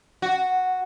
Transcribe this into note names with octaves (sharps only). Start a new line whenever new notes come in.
F#4